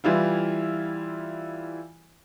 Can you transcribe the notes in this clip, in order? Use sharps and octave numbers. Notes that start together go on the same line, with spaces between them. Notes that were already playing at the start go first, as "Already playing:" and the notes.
E3 G3 E4 F4